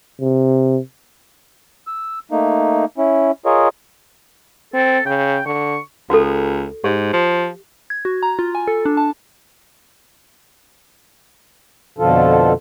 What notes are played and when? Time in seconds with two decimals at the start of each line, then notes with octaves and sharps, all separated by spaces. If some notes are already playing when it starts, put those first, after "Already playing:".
0.21 C3
1.87 E6
2.31 A3 A#3 D#4
2.98 C#4 E4
3.46 F4 G#4 A#4 C#5 D#5
4.74 C4 A4
5.06 C#3 G5
5.46 D3 C#6
6.10 C#2 F#4 A4
6.84 G#2 G4
7.13 F3
7.90 G#6
8.05 F#4
8.23 A#5
8.39 F4
8.55 G#5
8.67 A4
8.85 D4
8.97 A5
11.99 F2 B2 D3 F3 F4 A4